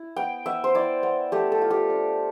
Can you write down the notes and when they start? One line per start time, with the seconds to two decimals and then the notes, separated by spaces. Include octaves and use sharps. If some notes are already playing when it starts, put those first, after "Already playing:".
Already playing: E4
0.16 B3 G5
0.46 B3 E5
0.64 C5
0.75 E4 D5
1.03 B3
1.32 A3 G4
1.52 A4
1.61 F4
1.70 G4
1.90 D4